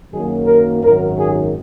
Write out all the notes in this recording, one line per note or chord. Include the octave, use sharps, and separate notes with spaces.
F#2 D#3 F#3 A#3 G#4
A#4
G#1 F#2 D#3 F#3 A#4
G#4